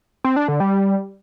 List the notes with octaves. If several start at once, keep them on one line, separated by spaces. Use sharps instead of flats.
C4
D4
D3
G3